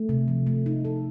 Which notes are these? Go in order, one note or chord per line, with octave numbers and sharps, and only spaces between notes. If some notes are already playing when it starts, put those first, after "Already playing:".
Already playing: A3
C3
F3
A3
D#4
A4